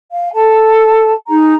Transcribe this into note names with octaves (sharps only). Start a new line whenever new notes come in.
F5
A4 A5
D#4 G#4 A#5